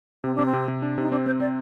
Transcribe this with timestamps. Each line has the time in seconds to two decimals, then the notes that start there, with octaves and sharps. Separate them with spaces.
0.24 C3 C4
0.35 C3 D4
0.46 C4
0.53 C3
0.68 C3
0.82 D4
0.98 C3 D#4
1.12 C4 D4
1.26 C4 C5
1.40 C4 D5